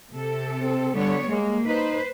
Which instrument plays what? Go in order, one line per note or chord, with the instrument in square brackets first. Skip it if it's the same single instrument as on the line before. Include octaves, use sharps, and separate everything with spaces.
[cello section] C3 A4
[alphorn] C4
[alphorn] D3 [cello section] G3 B3 C#5
[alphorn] G#3 [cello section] A#3
[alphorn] D#4 [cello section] B4 C5